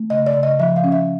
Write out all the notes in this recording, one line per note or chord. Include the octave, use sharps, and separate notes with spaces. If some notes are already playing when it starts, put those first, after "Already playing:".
Already playing: A3
C#3 D#5
D5
C#3
D#5
F3 E5
F5
C#4
E5